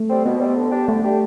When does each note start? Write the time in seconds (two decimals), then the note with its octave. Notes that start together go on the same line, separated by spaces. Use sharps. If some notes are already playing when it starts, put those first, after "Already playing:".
Already playing: A3
0.10 G3 C4
0.25 B2 B3
0.41 G3 C4
0.56 D3
0.72 G3 D4 G4
0.87 D3 A3
1.04 G3 D4 G4